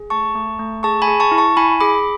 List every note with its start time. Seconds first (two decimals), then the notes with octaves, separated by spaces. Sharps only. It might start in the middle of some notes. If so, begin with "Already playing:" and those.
Already playing: G#4
0.10 A3 A5 C#6
0.35 A3
0.59 A3
0.83 G#4 A5 C#6
1.02 G#5 B5
1.07 G#4
1.20 A5 C#6
1.31 E4
1.38 A5 C#6
1.57 E4 G#5 B5
1.80 G#4 B5 D6